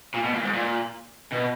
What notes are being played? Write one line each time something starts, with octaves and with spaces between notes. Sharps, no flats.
A#2
B2
A#2
G#2
A#2
B2